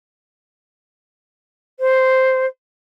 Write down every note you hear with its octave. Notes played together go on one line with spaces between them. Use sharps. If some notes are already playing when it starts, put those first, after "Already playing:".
C5